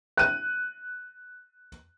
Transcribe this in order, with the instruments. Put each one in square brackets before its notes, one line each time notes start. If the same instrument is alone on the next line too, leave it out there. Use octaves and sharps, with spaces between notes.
[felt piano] F#6 D#7